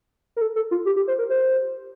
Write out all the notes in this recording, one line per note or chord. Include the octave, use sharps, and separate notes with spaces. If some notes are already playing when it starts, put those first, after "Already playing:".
A#4
A4
A4
F4
G4
G4
C5
A#4
C5